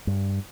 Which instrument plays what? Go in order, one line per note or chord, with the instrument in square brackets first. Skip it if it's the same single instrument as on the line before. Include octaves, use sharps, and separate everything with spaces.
[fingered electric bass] G2